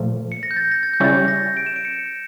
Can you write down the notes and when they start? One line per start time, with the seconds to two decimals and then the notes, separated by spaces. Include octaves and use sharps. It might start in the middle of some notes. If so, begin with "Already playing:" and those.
Already playing: A#2 F3 A3
0.32 C#7
0.43 A#6
0.51 G6
0.57 A6
0.71 A#6
0.83 A6
0.93 G6
1.00 C#3 G3 C#4 E4 A6
1.28 A#6
1.57 D7
1.66 E7
1.76 D7
1.85 C#7